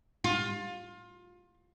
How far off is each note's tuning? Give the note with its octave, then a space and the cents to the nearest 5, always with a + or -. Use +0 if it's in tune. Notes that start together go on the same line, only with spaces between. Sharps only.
F4 +25